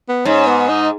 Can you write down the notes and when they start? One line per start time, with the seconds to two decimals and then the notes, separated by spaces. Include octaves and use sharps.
0.09 B3
0.25 G#2 C#4
0.47 B3
0.69 D#4